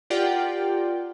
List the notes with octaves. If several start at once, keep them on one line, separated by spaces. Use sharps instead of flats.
F4 G4 A#4 D5 F#5 G5